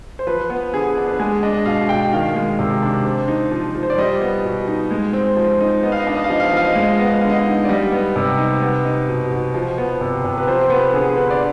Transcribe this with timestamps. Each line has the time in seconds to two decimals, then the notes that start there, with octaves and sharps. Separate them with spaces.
0.19 C5
0.27 F3 B4
0.50 B3
0.73 D3 G#4
0.97 D4
1.08 B4
1.20 G#3 G#4
1.43 D4 D#5
1.54 D#5
1.65 B2 F5
1.89 B2 G5
2.13 D#3 F5
2.36 G#3
2.59 C3
2.82 D4
3.05 C4
3.28 D#4
3.52 F3
3.75 F3
3.83 C5
3.90 D5
3.98 G3 D#5
4.21 B3
4.45 B2
4.68 D#4
4.91 G#3
5.13 C4
5.37 F3
5.61 D#4
5.83 B3 D#5
5.92 F5
6.00 D#5
6.07 D4 F5
6.15 D#5
6.24 F5
6.30 F3 D#5
6.40 F5
6.48 D#5
6.53 F3 F5
6.65 D#5
6.73 F5
6.76 G#3
6.81 D#5
6.88 F5
6.97 B3 D#5
7.04 F5
7.13 D#5
7.21 D3 F5
7.30 D#5
7.46 D#4
7.65 D5
7.68 G3 D#5
7.92 B3
8.16 C3
8.38 D#4
8.62 B3
8.85 D#4
9.09 B2
9.32 B2
9.54 F3
9.78 B3
10.01 C3
10.24 C3
10.37 B4
10.47 F3 C5
10.70 B3 B4
10.93 D3 G#4
11.17 D3 B4
11.31 D5